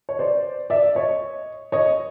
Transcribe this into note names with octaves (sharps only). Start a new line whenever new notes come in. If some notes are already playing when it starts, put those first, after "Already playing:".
C#5
C5 D5
D5 E5
C#5 D#5
C#5 D#5